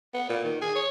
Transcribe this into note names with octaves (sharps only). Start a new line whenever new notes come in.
B3
A#2
D#3
G#4
C#5